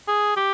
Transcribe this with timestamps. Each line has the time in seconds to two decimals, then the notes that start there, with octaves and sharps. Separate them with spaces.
0.08 G#4
0.36 G4